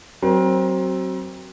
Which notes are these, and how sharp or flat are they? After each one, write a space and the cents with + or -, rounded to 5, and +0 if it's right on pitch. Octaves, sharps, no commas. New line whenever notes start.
F#3 +25 C4 +15 A#4 +35